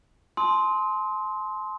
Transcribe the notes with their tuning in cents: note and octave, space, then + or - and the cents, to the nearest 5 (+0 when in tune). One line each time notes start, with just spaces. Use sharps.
A5 -40 C6 +0 D#6 +40